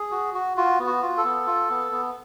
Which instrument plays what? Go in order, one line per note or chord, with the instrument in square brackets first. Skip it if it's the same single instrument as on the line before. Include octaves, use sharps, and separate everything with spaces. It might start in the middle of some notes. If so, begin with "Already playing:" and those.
Already playing: [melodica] G#4
F#4
F#4
F4 F#4
B3
F#4
F4
A4
B3
F4
B3
B3